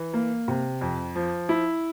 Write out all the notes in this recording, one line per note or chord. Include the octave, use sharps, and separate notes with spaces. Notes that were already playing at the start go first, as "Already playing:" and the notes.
Already playing: E3
A#3
C3
F2
F3
E4